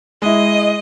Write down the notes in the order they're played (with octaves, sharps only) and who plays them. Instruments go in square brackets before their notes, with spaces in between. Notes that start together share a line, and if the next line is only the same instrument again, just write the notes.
[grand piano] G#3 E4 [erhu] D#5